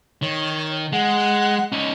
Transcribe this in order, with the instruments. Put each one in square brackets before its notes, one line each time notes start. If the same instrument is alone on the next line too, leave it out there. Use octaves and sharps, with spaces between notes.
[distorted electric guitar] D#3 [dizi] C#5
[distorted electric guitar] G#3 [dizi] F#5
[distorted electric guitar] C#4 D#4